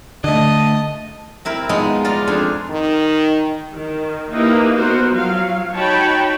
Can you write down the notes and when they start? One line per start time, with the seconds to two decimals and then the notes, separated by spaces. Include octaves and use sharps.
0.24 D3 A3 D#5 A5
1.45 C4 E4 A#4 E5
1.69 F3 G#3 B3 D#4
2.04 F4 D5 A#5
2.27 F2 D4 G#4
2.70 D#3
3.73 D#3
4.32 A#3 D#4 E4 G4 B4
4.75 B3 F#4 A#4 C5
5.09 F3 F#3 F5
5.73 D#4 F#4 C#5 G5 A5 B5